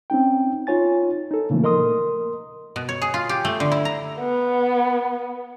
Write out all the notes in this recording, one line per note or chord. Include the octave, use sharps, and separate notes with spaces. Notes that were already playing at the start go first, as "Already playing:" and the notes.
C4 C#4 D#4 G5
D#4 F4 C#5 G#5 A6
D#4 A4
A#2 C#3 E3 F3 A3 A#3
A#4 D#5 C6 D#6
B2
C#5
G#4
F4
G4
A3
D3
E4
A#5
B3